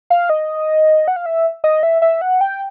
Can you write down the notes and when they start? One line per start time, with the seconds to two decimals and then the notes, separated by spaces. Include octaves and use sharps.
0.10 F5
0.30 D#5
1.08 F#5
1.16 F5
1.26 E5
1.64 D#5
1.83 E5
2.02 E5
2.21 F#5
2.41 G5